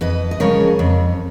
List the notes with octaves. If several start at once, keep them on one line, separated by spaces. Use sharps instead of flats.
F2 B4 D#5
D#5
C#3 F3 G#3 C#4 A#4 C#5
F2